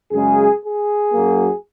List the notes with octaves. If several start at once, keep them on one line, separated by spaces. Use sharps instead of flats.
F#2 C#3 G#3 G#4
G#4
F#2 F#3 A#3